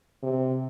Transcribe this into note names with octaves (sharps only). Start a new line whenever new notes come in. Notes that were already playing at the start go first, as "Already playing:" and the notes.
C3